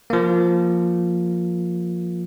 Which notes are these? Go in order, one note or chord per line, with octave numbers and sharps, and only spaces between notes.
F3 A#3